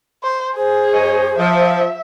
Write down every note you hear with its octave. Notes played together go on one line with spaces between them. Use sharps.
C5
G#4 C5
F#2 C#5 D#5
F3 E5